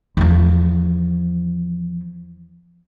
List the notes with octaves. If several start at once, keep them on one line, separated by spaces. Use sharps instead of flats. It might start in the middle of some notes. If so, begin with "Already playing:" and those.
E2 F3